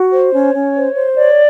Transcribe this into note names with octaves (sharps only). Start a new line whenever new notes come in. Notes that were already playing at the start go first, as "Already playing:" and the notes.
Already playing: F#4
C5
C#4 C#5
C#4
C5
C5
C#5 D5